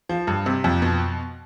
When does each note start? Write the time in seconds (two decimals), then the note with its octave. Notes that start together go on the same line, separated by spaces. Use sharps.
0.09 F3
0.27 G2
0.46 C3
0.64 F2
0.82 B2